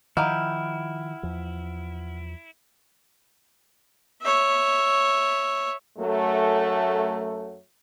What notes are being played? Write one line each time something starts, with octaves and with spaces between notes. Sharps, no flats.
D#3 F3 D#4 E4 G4 F5 F#5 F6
E2 F3
C#5 E5
F#2 F#3 A3